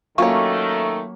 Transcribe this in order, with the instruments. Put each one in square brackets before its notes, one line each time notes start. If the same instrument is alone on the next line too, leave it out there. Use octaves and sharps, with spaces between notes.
[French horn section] D#3 A3 [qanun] F#3 A#3 C#4 [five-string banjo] F4 C#5 [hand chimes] C#6